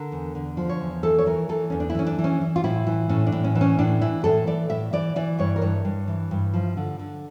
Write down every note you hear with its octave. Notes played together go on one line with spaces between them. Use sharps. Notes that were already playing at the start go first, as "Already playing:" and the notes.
Already playing: D3 A#4
E2
D3
F3
C#5
E2
E3 A4
C#5
E3 A#4
E3 A4
E2 C#4
D4
E4
E3 C#4
D4
E3
C#4
E3
F4
A2 E4
E3
A2 C#4
D4
A2
C#4
E3 D4
C#4
A2 D4
E3 E4
A2 A4
E3 D5
A2 E5
E3 D5
E3 D5
G2 C#5
A#4
G2 C#5
G2
E3
G2
F3
D3
D3